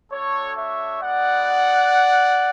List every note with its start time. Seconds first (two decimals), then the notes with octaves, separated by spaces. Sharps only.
0.12 A3 D4 F#4 A4 C#5
0.56 C#5 E5
1.00 G#3 B3 E4 D5 F#5